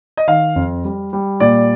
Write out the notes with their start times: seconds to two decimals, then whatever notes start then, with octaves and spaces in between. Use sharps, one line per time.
0.17 D#5
0.27 D#3 F5
0.56 F2
0.84 G3
1.13 G3
1.40 A#2 D5